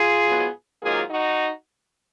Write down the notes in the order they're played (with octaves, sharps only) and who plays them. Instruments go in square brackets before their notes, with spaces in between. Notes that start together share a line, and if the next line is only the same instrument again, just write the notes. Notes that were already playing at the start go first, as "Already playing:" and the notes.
Already playing: [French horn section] F4 G#4
G#2 F#3 B3
G#2 D#3 F#3 A#3 F4 G#4
D#4 F#4